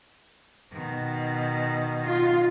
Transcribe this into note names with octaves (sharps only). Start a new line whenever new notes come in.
B2 D#3
F4